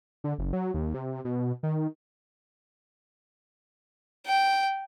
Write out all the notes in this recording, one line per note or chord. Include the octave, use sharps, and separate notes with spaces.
D3
F#1
F#3
D#2
C3
B2
D#3
G5